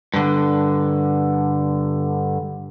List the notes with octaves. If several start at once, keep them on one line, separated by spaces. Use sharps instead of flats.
G2 D3